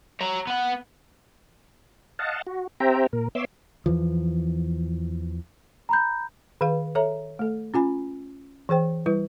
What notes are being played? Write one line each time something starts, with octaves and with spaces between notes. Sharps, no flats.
C#5 A#5
B3 F#5
D#5 F5 F#5 A5
F#4
C4 G4 C5 E5 G5 A#5
A#2 A#4
B3 C#5 E5 C6 D6 E6
E2 E3 F3
A#5 B5 G6
D#3 G#4 B4 F5
A4 C#5 E5 A#5
A3 A4
C#4 F4 G#5 B5
E3 G#4 C5 G5
G3 E4 B4